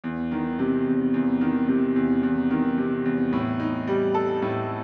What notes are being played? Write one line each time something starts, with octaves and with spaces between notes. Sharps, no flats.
E2
D#3
C3
E2
E2
D#3
C3
E2
E2
D#3
C3
E2
A2
D#4
G3
A4
A2